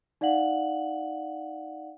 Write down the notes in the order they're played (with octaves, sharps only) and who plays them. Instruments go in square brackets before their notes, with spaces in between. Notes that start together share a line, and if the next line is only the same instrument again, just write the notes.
[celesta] D#4 D5 F5 F#5 F#7